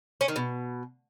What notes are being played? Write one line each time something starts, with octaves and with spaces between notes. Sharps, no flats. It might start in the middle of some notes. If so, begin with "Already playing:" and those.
C#4
D#3
B2